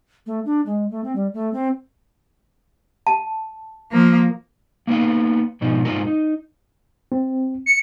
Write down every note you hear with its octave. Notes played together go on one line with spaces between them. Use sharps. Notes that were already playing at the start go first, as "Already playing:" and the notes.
A3
D4
G#3
A3
C4
G3
A3
C4
A5
F3 A#3
A#3 B3 D#4 B4 F5
G#2 B2 F3 D#4
G#2 D#4 F4 A#4
D#4
C4
C#7